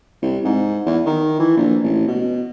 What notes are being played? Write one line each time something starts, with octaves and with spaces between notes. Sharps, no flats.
C2
G#2
E2
D#3
E3
A#1
A1
B2